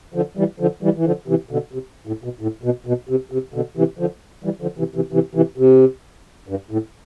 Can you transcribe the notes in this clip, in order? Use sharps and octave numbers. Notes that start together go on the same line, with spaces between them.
D3 F3
E3 G3
D3 F3
E3 G3
E3
D3 F3
C3 E3
B2 D3
C3
A2
B2
A2
B2
B2
C3
C3
B2 D3
C3 E3
D3 F3
E3 G3
D3 F3
C3 E3
C3 E3
C3 E3
C3 E3
C3
G2
A2